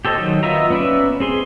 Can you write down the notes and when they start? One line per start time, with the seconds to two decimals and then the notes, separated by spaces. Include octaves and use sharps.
0.05 G4 A4 C5 D#5
0.18 D#3 F#3
0.43 B3 F4 D#5 E5 A#5
0.70 B3 C#4 B4 D5 E5
1.20 C4 G#4 C6